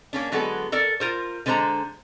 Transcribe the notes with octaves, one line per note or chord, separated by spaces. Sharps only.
A#3 C#4 D4
D3 F#3 G#3 B3 A4
A4 A#4 D5
F4 A#4 C5
D3 G#3 D4 C5 A#5